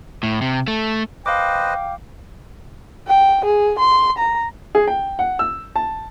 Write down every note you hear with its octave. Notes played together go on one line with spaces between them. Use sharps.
A2
C3
A3
B4 C5 D#5 F5 G5 D6
G5
G#4
C6
A#5
G#4
G5
F#5
E6
A5